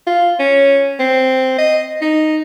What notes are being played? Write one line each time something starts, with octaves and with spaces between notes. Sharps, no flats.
F4
C#4
C4
D#5
D#4